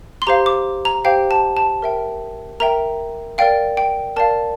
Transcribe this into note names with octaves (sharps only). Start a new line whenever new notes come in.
C6
G4 C5 F5 A#5
D6
A#5
G4 C5 F5 G5
A5
A5
A#4 E5 G5
A#4 E5 G5 A#5
A#4 D5 F5 G5
G5
A#4 D5 F5 A5